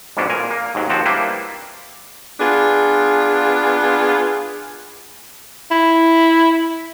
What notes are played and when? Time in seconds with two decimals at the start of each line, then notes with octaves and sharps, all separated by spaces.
0.17 F2 G#2 B2 C#4 D4
0.30 A#2 A#4 G#5
0.51 A#3
0.75 D#2 G#2 F#3
0.89 D#2 F3 C4 F#4 A5
1.06 G3 A#3 D4 E4 B4 C5
2.40 B3 D4 F4 G#4
5.71 E4